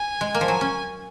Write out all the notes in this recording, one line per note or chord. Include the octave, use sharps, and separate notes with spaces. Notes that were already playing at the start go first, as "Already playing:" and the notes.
Already playing: G#5
G#3
A#3
F3
F#3
C#4